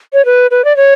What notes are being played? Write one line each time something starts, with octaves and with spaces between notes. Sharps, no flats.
C#5
B4
B4
D5
C#5